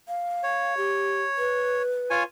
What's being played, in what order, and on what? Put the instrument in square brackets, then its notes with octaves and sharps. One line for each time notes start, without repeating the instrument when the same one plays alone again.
[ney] F5
[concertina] C#5
[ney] G4
B4
[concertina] F4 C#5 G#5